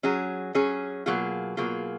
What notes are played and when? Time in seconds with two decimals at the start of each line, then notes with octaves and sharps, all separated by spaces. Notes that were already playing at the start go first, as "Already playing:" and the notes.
0.03 F#3 C#4 G#4
0.55 F#3 C#4 G#4
1.06 B2 F#3 A#3 F4 G#4
1.57 B2 F#3 A#3 F4 G#4